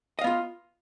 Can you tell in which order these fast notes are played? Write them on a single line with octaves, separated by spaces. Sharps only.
D#5 F5 B3 F4